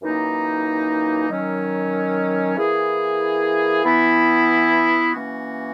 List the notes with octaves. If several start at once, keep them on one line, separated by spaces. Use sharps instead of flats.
F#2 E3 A#3 D#4
D#3 F#3 C#4
E3 A#3 E4 G#4
E3 B3 E4
E3 A#3 C#4 F#4